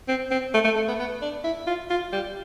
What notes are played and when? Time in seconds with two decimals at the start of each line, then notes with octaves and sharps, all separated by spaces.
0.08 C4
0.31 C4
0.54 A3
0.64 A3
0.76 A3
0.88 B3
0.99 B3
1.22 D4
1.44 E4
1.67 F4
1.90 F4
2.13 G3